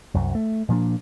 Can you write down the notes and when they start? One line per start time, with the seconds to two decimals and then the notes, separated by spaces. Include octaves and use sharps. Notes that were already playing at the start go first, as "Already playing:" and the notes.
0.14 C2 F#2
0.35 A3
0.69 A#2 F3 A#3 D4